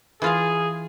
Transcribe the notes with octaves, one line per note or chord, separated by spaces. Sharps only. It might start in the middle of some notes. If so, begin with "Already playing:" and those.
E3 F4 G#4 F5